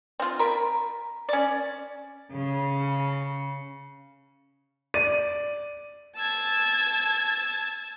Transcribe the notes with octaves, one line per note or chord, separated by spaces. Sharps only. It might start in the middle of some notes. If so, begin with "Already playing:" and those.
C4 F4
A#4 B5
C#4 D5
C#3
D5 D#7
A5 E6 G#6